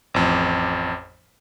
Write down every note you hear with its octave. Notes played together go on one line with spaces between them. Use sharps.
A1 F2